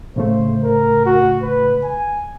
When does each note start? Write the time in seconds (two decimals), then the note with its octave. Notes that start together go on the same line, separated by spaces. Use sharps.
0.16 A2 C#3 A3 C5
0.63 A#4
1.06 F#4
1.42 B4
1.84 G#5